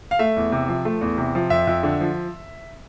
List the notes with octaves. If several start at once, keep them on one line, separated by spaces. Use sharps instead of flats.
F5
A3 E5
E2
C3
F3
A3
E2
C3
F3
F2 E5
F2
D3
F3